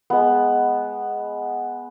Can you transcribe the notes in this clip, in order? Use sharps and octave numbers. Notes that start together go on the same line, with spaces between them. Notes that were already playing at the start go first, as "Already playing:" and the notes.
G#3 B3